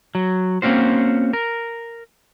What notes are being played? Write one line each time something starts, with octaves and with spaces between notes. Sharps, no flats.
F#3
A#3 C4 C#4 F#4 C5
A#4